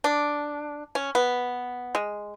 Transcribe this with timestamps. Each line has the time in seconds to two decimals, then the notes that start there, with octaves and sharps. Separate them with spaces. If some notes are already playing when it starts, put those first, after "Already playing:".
0.04 D4
0.95 C#4
1.15 B3
1.95 G#3